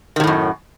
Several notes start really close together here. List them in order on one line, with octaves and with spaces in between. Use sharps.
D#3 C3 A2 F#2